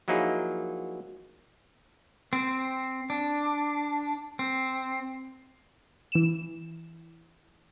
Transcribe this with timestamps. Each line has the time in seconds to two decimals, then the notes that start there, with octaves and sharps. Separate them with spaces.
0.08 F3 F#3 A#3 D#4 E4 G#4
2.33 C4
3.10 D4
4.39 C4
6.12 E3 E7